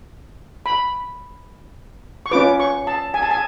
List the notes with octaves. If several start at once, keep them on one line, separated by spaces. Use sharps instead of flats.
B5
C#6
C#4 F4 B4 D6
C#6
A5
G#5
A5
G#5